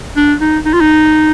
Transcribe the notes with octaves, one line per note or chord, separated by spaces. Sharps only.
D4
D#4
D#4
F4
D#4